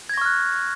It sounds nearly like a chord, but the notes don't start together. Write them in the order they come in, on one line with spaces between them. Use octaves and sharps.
G#6 A#6 C#6 F6 F#6